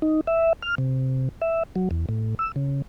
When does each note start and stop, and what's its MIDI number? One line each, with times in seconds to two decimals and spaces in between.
0.02 0.21 63
0.27 0.53 76
0.62 0.75 89
0.78 1.29 48
1.42 1.63 76
1.76 1.89 54
1.91 2.06 40
2.09 2.35 45
2.39 2.52 88
2.56 2.82 49